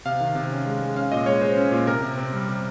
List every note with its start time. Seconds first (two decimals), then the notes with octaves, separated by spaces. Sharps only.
0.05 C3 F5
0.21 D#3
0.35 C3
0.51 C#4
0.66 G#3
0.82 G#3
0.96 C#4 F5
1.12 A#2 D#5
1.26 G#3 C#5
1.41 G#3 C5
1.57 C#4
1.72 A#2
1.87 C3 A#4
2.03 C3
2.17 C4
2.33 G3
2.49 C3